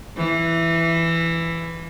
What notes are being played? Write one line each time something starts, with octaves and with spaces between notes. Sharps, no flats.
E3